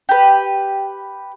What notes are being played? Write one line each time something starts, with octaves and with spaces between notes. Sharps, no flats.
G4 B4